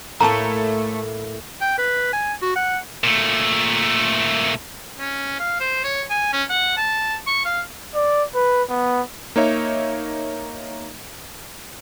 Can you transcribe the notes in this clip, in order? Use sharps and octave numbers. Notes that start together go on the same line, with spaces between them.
A2 A3 A#3 C#5 A5 A#5
G5
B4
G#5
F#4
F#5
A#2 A3
C#4
F5
C5
C#5
G#5
C#4
F#5
A5
C#6
F5
D5
B4
B3
A#3 D#4 C#5 E5